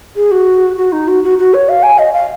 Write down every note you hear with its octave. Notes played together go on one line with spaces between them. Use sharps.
G#4
F#4
F#4
D#4
F#4
F#4
F#4
C#5
F5
G#5
D#5
F5